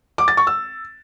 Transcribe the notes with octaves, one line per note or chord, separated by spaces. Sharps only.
D6
A6
C#6
E6